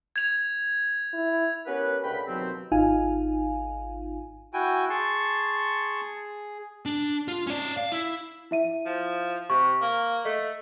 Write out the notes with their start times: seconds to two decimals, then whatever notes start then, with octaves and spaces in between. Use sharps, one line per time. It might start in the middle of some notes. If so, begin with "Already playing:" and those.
0.16 G#6 F7
1.14 E4
1.67 B3 C#4 G4 A#4 B4
2.04 D2 C#3 A#4 G5 B5
2.27 D#2 B2 F#3 C4
2.72 G#1 D#4 F4 F5 G#5
4.54 E4 F#4 G5 G#5
4.90 G#4 A5 C6 C#6
6.86 D4
7.28 F4
7.47 C#4 D5
7.77 F5
7.92 E4
8.51 E4 E5 D#7
8.86 F3
9.50 C3 C#6
9.82 A#3
10.25 A3 D#5